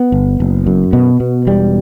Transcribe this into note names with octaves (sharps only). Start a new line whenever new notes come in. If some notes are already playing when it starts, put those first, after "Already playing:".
Already playing: B3
G1
F#1
F#2
B2 B3
B2
E1 G3